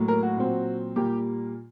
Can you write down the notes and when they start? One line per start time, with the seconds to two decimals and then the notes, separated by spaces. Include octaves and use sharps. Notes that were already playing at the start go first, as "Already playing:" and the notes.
Already playing: A2 F#3 A#3
0.08 A#4
0.23 F#4
0.37 A#2 F#3 C4
0.96 A#2 G3 A#3 G4